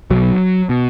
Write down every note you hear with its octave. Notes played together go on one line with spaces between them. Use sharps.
B1 B2 F#3
B2